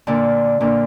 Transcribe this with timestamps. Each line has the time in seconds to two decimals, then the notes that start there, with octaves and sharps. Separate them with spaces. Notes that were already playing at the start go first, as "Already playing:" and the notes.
0.07 A#2 D3
0.60 A#2 D3